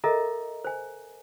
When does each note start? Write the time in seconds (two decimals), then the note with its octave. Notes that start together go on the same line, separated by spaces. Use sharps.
0.04 A4 A#4 D#5 E5 A#5
0.65 C5 G#5